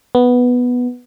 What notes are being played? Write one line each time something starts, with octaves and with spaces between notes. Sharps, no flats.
B3